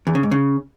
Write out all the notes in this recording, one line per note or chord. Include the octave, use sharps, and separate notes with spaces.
E2
C#3
G#2
C#3